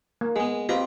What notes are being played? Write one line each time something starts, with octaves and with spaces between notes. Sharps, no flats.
A#3
G#3 B3 G#4
C4 F4 G4 B4 D#5 A#5